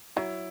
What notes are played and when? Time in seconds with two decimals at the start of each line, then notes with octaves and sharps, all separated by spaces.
0.16 F#3 E4